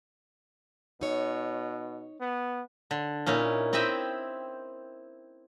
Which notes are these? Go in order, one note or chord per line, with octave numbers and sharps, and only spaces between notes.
B2 D#4 C#5
B3
D3
A#2 C#4 D#4 E4
C4 E4 G4 D#5 E5 G5